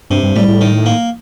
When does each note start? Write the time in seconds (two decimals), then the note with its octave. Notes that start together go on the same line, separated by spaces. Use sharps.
0.10 G2 C3
0.23 G2
0.36 A2 G3
0.48 A2
0.61 D#3
0.86 A#3